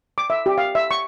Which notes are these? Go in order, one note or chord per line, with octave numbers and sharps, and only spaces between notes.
D6
E5
G4
F5
E5
C#6